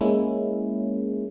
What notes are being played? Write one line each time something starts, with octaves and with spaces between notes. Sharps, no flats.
G#3 A#3 C#4 E4